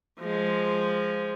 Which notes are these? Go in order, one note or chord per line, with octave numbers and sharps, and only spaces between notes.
F3 G#3